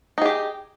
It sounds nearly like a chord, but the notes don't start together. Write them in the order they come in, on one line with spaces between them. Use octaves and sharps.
D#4 G#4 G4